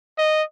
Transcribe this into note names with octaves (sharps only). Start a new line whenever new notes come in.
D#5